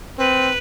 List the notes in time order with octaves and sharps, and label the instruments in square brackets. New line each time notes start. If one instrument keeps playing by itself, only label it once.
[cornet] C4 [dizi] B4